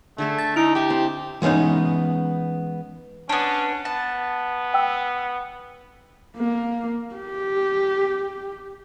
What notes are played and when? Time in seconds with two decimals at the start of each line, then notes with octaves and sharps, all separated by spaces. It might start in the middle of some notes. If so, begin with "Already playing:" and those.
0.18 D3 A3 G#4 A4
0.39 A6
0.56 D#4 E4 D7
0.75 G4 E5 G5
0.90 C4
1.42 E3 G#3 B3 C#4 D#4
3.29 B3 C#4 D4
3.85 B3 A5
4.74 G5 E6
6.37 A#3
7.15 G4